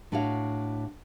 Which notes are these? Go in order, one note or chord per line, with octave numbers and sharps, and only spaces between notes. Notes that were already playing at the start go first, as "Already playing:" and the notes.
A2 D4 F#4 C#5 F5